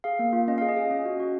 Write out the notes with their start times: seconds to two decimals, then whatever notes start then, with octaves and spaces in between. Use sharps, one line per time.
0.04 G#4 F5
0.19 A#3
0.33 F4
0.48 C#4 D#5
0.58 G#4 F5
0.69 D#5
0.76 G#4
0.91 C#4
1.05 F#4
1.20 F#4